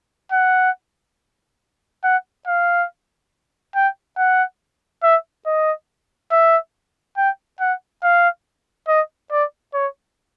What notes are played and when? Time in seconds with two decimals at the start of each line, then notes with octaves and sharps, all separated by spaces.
0.32 F#5
2.04 F#5
2.47 F5
3.75 G5
4.17 F#5
5.03 E5
5.46 D#5
6.31 E5
7.17 G5
7.60 F#5
8.03 F5
8.88 D#5
9.31 D5
9.74 C#5